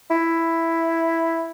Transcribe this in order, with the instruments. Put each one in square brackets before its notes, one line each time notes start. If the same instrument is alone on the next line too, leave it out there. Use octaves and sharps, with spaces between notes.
[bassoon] E4